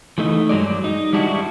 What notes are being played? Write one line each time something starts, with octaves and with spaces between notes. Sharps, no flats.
E3 A3 D#4
G2 F#3 G#3 D5
D#4
G3 G#3 D4 E4 F#4